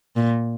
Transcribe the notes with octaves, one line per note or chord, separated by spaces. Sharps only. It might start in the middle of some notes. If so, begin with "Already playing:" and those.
A#2